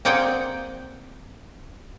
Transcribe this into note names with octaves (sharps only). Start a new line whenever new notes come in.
A#3 C4 G#4 D5 F#5 G5